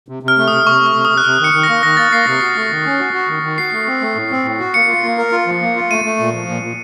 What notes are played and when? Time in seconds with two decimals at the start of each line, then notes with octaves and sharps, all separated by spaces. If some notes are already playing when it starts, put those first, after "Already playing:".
0.09 C3
0.23 C3
0.28 F6
0.37 A3
0.48 C3 D#6
0.67 C3 C#6
0.81 A3
0.86 D#6
0.96 C3
1.05 D#6
1.10 C3
1.17 F#6
1.25 C3 F6
1.40 D#3 C#7
1.54 D#3
1.63 A#6
1.69 A#3
1.83 D#3 A#6
1.97 A#3 A6
2.12 A#3 C7
2.26 C3 A#6
2.41 F#4 C7
2.56 A3
2.70 D#3
2.85 C#4
2.99 F#4
3.14 F#4
3.29 D#3
3.43 D#3
3.58 F#4 C7
3.72 A3
3.87 C4
4.01 A3
4.15 A2
4.30 C4
4.44 A2
4.59 F#4
4.74 A#3 C#7
4.89 F4
5.03 A#3
5.17 A#4
5.32 F4
5.47 F3
5.61 A#3
5.76 F4
5.90 A3 D#7
6.05 A3
6.19 A#2
6.33 F3
6.49 A#2
6.63 A#2